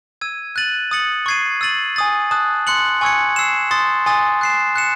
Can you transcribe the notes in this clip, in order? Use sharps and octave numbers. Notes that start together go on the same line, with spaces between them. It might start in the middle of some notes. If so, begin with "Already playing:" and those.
E6 G#6 D#7
F#6 A6 D#7 F#7
D#6 A6 C#7 F#7
C#6 G#6 C7 D#7
E6 A6 D#7 F#7
G#5 D#6 A6
A5 D#6 F#6
C6 F#6 C#7 F#7
G#5 C#6 E6 G#6 C#7
E6 C7 E7
C6 D#6 A6
G#5 C6 D#6 A6
F#6 C7 E7
F#6 C#7 E7